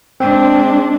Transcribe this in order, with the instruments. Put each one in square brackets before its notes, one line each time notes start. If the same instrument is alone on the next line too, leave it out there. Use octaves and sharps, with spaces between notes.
[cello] G#3 D4 [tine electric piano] C4